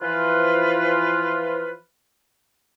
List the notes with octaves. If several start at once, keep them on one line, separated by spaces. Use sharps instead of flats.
E3 F3 F4 B4